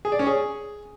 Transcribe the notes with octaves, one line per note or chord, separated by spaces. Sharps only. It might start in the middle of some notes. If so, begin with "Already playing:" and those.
G#4
D5
C#4
G#4